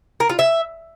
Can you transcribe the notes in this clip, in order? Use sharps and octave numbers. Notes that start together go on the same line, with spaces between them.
A#4
F4
E5